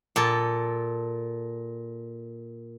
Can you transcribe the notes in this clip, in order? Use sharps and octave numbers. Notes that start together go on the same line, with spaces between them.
A#2 A4